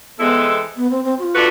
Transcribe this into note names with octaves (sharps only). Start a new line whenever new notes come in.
E3 G#3 B3 C4 E4 A4
B3
C4
C4
F#4
F4
A3 D4 F#4 B4